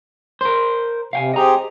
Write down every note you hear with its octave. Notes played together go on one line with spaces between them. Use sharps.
A#4 C5
C3 F5 G5 G#5
C4 G4 G#4 D#5 A#5